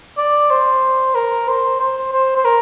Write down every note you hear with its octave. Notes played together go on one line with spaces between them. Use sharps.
D5
C5
A#4
C5
C5
C5
C5
A#4